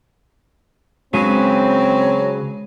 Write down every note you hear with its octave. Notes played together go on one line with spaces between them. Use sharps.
C#3 F#3 G#3 C4 G#4 B4 D#7